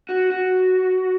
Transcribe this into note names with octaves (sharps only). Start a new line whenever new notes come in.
F#4
F#4